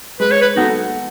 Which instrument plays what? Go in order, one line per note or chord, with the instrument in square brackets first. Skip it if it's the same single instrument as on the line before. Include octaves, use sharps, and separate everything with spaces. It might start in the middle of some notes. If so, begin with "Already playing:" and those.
[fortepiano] G#3 [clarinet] B4
[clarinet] C#5
B4
[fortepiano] B3 F#4 A4 [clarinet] D#4